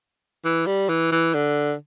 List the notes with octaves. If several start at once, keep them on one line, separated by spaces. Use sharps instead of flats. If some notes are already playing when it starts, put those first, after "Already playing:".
E3
G3
E3
E3
D3